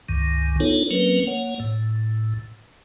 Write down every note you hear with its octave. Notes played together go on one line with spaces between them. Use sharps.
C#2 G2 D#3
B3 D4 D#4 F4 A4 C#5
F#3 A#3 C4 C#4 A#4 B4
A#3 C#5 F#5
A2